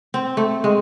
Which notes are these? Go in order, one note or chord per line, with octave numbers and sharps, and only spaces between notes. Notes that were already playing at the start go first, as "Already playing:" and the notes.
C4
A3
G#3